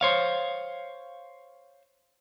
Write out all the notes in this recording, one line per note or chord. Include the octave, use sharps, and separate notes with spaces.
C5 C#5 F5